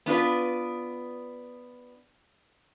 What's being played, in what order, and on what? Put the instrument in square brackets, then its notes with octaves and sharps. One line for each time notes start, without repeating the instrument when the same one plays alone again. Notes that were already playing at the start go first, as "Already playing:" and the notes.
[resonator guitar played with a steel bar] B3 D4 F4 B4